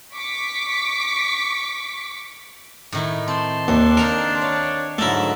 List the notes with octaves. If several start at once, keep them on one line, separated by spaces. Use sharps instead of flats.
C#6 D6 B6
A2 D#3 E4
C4 A5 C6
D#2 D#3 D4
D#4 A4 A#4 F5
C#5 F5
G#2 D3 F#3 A3 E4 A#4 D5